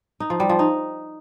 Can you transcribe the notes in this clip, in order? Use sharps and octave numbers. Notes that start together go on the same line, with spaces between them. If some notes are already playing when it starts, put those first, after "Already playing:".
D#4
F3
G3
F3
D#4